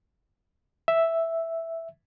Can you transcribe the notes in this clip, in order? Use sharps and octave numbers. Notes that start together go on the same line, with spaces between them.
E5